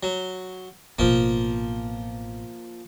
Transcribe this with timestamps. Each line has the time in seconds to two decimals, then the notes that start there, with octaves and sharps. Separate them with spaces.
0.03 F#3
0.99 A1 B2 F3 A#3